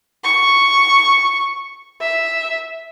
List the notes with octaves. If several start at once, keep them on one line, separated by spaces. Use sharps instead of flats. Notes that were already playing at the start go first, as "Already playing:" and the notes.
C#6
E5